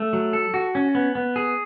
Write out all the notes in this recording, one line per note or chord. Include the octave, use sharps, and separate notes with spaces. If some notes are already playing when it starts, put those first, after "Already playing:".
Already playing: A3
F#3
A4
F#4
C#4
B3
B3
G#4